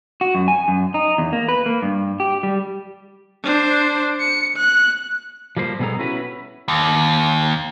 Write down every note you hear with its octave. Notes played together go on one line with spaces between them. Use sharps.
F#4
F#2
G#5
F#2
D#4
E2
A#3
B4
A#3
G2
G4
G3
D4 C5
C#7
F#6
F3 G3 A#3 C5
B2 G3 B3 G#4 A4 A#5
C#4 E4 F#4 B4
D#2